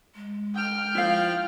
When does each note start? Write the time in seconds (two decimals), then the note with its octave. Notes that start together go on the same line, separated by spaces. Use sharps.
0.15 G#3
0.54 G5 F6
0.95 F3 E4 F5